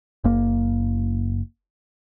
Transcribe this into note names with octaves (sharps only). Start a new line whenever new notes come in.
F#1 A#3